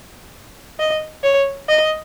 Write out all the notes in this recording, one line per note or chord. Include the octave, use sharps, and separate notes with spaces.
D#5
C#5
D#5